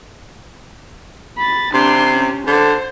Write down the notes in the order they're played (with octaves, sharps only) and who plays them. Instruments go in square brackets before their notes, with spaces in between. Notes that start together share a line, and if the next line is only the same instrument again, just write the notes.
[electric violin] B5 A6
[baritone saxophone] C3 [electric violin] D4 C6
[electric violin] C#4
[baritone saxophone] D3 [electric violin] C5